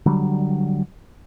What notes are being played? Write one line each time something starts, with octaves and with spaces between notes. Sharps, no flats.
D3 F#3 G3